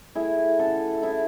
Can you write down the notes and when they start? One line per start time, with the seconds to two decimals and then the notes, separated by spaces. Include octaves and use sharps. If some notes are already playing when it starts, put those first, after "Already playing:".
0.15 A3 E4 G#4
0.59 C#3 F#4 A4
1.02 C#3 E4 G#4